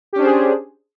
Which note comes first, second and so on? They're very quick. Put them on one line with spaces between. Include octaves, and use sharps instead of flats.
G4 C#4 D4 C5 G#4